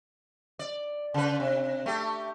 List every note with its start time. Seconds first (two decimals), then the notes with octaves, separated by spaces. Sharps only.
0.59 D5
1.14 C#3 B4
1.40 C3
1.86 A3 G4